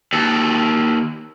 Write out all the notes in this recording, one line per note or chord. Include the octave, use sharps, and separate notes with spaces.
D#2 A4